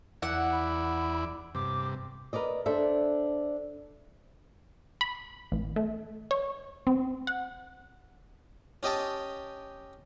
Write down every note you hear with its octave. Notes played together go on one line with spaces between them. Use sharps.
E2 E4 D5 F#5
B5
G2 C3 D6
A#4 B4 D5 D#5
D4 A4 C5 E5
B5
A1
A3
C#5
C4
F#5
C#4 G4 D#5 G5 A5